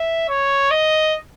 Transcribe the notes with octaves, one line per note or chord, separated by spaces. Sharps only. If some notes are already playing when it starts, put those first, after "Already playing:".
Already playing: E5
C#5
D#5